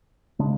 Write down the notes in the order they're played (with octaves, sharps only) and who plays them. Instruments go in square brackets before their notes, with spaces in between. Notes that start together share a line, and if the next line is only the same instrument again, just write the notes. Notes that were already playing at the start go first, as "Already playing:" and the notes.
[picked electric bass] C#3 G#3 D4